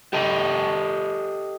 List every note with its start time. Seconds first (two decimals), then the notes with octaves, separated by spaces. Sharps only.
0.13 G4 A4 D#5 A5